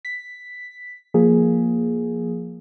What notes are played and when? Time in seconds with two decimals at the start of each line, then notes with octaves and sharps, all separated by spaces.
0.05 B6
1.14 F3 A#3 G#4